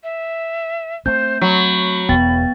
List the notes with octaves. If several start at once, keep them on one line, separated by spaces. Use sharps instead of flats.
E5
A3 C4 C5 G6
F#3 B5
E1 E2 B3 G5 A6